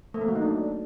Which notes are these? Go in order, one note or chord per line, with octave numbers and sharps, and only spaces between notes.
A3
A#3
F#3
D#4
D4